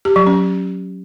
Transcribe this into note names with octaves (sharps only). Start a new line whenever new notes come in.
G4
F#3
C#4